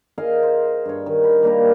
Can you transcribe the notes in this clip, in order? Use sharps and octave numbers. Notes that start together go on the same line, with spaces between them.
G#4 A#4 D#5 F5
C5
G2 C#5
D#3
B5
G3 A#3 G4 A#4